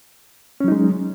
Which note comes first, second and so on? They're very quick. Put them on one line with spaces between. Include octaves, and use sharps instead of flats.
C#4 F#3 D#4 G#3